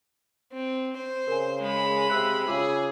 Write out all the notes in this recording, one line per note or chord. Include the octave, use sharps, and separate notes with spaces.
C4
C5
C#3 A#4 G#5
G#3 B5
C3 C5 E6 F#6
C#3 F4 G#4 D6 E6